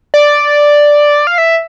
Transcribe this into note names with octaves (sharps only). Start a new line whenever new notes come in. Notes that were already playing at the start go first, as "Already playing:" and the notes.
D5
F5
E5